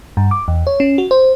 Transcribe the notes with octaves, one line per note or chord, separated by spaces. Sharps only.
G2
D6
E2
C#5
C#4
F#4
C5